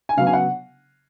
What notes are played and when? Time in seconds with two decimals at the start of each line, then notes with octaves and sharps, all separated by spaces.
0.09 G#5
0.17 C#3 F#3 B3 F5
0.27 G#5
0.33 F#5